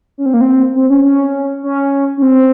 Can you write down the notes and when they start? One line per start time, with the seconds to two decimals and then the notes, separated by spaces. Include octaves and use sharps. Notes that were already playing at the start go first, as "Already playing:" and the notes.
0.18 C#4
0.26 C4
0.34 A#3
0.41 C4
0.75 C4
0.90 C#4
1.05 C#4
1.63 C#4
2.17 C#4
2.22 C4